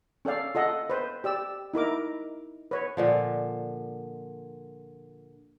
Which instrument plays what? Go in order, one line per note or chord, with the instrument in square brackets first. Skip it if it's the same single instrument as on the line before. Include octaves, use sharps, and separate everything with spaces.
[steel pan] C#4 A4 D5 F5
F4 A4 D#5 F#5
B4 C5
G4 D5 E6
D#4 E4 A#4 D6
B4 C#5
[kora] A#2 D3 F3